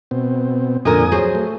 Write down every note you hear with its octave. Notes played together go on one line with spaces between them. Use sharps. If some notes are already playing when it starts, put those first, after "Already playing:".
B2 C4
F2 A#2 D3 A#4 G#5 D#6
F#3 G#4 C5
A3